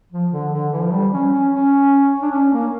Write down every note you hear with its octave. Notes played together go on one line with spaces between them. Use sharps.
F3
D3
D3
E3
F3
G3
C#4
C#4
C#4
D4
C#4
A#3